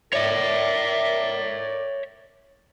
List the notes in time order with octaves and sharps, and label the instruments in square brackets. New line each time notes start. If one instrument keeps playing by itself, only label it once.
[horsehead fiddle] A#4 D5 [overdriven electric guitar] C#5 E5